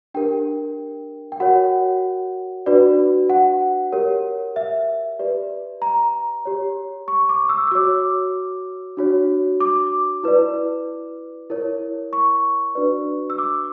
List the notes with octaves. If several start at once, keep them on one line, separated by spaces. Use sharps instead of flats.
D4 G4 A#4 G5
G5
F#4 A#4 C#5 F#5
D4 F#4 B4 D5
F#5
G4 A#4 C#5
E5
G4 B4 D5
A#5
G4 C#5
C#6
D6
E6
E6
F#4 C#5 D6
D4 F#4 C#5
D6
E4 B4 D5
E4 A#4 C#5
C#6
D4 F#4 B4 D5
E6
D6